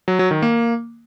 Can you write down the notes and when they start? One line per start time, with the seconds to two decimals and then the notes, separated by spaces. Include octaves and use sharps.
0.08 F#3
0.19 F#3
0.31 D#3
0.42 A#3